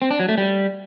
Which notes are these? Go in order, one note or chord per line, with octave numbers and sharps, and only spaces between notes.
C4
D4
F#3
A3
G3